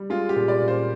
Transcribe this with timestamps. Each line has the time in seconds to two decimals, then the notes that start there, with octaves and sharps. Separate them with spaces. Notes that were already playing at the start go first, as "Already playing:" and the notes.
Already playing: G3
0.10 G#3 F4
0.29 G4
0.36 A#2
0.48 D5
0.62 A#2
0.68 C5